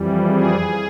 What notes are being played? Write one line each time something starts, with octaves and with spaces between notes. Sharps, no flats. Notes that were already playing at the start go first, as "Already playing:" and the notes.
Already playing: F2 E3 G3
G#4